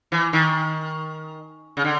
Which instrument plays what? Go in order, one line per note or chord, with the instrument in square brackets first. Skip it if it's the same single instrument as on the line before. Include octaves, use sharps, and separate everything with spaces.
[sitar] E3
D#3
C#3
D3